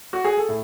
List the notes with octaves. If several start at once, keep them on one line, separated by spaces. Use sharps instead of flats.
F#4
G#4
A4
A2